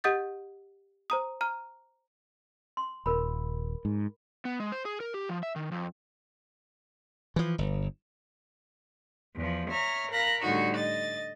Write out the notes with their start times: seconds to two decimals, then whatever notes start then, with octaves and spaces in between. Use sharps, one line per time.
0.04 G4 D#5 F#5 D#6 G6 A6
1.10 C5 A#5 D#6
1.41 A#5 F6
2.77 C6
3.06 D#1 A#4 B5
3.85 G#2
4.45 B3
4.60 G#3
4.72 C5
4.85 G#4
5.00 A#4
5.14 G4
5.29 F3
5.43 E5
5.56 D#3
5.72 F2
7.36 E3 F3
7.58 G1
9.36 E2 F3
9.70 C#5 E5 A#5 F6
10.11 A#4 F5 A#5 B5 F#6 A#6
10.41 A2 D3 G3 D#4 F#4 C#5
10.75 D#5 A6